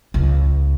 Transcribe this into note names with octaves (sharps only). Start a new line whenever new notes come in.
C#2